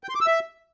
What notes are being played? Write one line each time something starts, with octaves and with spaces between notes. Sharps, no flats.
G5
C6
D6
E6
E5